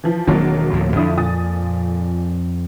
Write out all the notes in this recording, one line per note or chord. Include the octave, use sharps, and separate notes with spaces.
E3 F3
E1 D#3 F#3 A#3 C4 D4
D2 A2 F3
F2 D3 F3 E4 D#6
A#2 D#6 A6